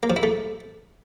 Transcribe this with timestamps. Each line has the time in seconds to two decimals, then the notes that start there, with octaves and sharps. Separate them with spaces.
0.03 A#3
0.10 F3
0.16 E4
0.23 A3